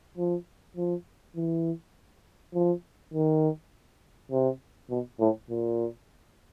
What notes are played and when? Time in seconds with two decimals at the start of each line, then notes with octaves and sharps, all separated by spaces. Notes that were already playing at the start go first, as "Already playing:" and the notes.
0.17 F3
0.77 F3
1.36 E3
2.54 F3
3.13 D#3
4.31 C3
4.90 B2
5.20 A2
5.50 A#2